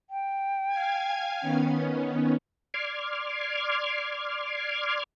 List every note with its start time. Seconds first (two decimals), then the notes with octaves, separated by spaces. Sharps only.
0.10 G5
0.69 F5 G#5 G#6
1.41 D#3 B3 C#4
2.74 D5 C6 D6 F6 G#6